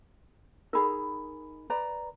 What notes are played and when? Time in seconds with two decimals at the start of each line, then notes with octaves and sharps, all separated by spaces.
0.73 D#4 G#4 A#4 B5
1.70 B4 D5 A#5